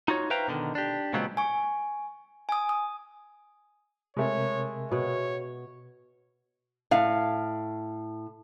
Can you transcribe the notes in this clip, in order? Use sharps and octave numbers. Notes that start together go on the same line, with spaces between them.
D#4 F4 F#4 C#5
B4 C5 E5 F5 G5 A#5
B2 D3 D#3
D4 G4
A#2 C#3 F#3 G#3 B3 C4
G#5 C#6
G#5 D#6
D#6
C3 G#3 A3 A#4 C#5
B2 C#5 F#5
A2 F5